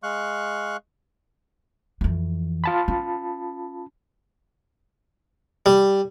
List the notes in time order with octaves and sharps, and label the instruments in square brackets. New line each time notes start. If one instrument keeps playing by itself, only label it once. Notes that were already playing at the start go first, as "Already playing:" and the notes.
[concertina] G#3 F5 C#6 F#6
[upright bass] F2 E3
[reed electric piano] F4 A5 B5
[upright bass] C#4
[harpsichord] G3